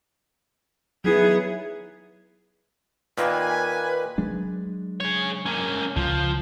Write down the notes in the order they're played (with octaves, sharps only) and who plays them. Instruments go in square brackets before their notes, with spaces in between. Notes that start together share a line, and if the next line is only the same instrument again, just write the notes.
[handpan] F#3 D#4 E4 [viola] B3 G#4
[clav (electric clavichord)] A#2 D#3 A#3 [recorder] B4 [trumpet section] G#5
[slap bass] F#3 G#3 D4
[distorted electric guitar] G#4 C#5
A#3 C#4
[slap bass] C#2 [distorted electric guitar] F3